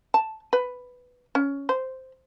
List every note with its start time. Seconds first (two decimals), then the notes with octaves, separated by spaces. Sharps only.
0.14 A5
0.53 B4
1.35 C#4
1.69 C5